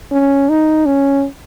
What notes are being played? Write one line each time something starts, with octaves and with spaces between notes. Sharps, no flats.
C#4
D#4
C#4